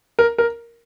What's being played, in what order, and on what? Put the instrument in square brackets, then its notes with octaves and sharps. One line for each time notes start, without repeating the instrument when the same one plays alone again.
[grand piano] A#4
A#4